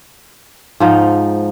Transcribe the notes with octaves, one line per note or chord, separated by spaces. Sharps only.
G#2 F3 D#4